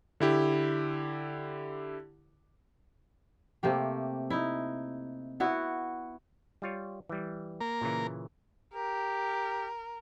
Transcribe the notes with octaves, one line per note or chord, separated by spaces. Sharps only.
D3 E4 G4
C3 A3 A#3 G4
D#4 E4
B3 E4 F#4
G3 F4 C#5
E3 G3
A#3 A#4
A#2 C#3 E3
G4 A#4